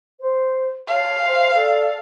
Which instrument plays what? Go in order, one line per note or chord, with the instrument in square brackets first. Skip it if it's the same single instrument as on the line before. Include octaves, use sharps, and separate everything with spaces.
[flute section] C5
[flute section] C#5 A5 [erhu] F5
[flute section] C5 E5
A4 D5